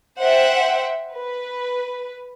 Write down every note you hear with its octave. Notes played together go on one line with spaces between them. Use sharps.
C5 E5 F#5 G5
B4